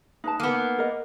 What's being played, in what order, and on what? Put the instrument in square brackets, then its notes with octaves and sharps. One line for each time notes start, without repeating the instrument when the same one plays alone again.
[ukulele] D#4 B4 A5
[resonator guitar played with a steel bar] A#3 B3
[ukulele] A#4 D#5